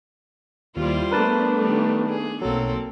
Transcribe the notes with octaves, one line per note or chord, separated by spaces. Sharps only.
D#2 G3 E4 F4 C5
A3 B3 D4 A#4 B4 A5
D#3 G3
G#4
B1 F#3 A#3 C4 A4